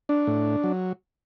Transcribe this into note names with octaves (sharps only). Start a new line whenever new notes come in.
D4
A2
F#3